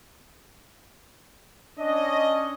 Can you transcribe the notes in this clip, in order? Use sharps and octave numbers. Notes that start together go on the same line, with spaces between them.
C#4 D4 D#5